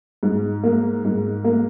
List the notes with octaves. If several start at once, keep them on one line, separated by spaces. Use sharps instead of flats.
G#2
A#3
G#2
A#3